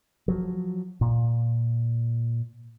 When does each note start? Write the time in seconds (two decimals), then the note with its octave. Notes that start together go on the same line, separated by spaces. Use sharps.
0.28 F3 F#3
1.01 A#2